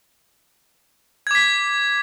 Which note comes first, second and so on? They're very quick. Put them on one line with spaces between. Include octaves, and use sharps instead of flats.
G#6 D6 B6